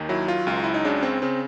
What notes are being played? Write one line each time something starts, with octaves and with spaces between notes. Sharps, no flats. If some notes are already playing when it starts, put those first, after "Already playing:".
Already playing: D#2 D#3
F#3 E4
F4
C#2 F4
E4
D#4
C#3 D4
C4
C#3 C4